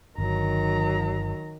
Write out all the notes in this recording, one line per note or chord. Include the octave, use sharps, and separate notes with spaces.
G1 D#3 F#3 A#5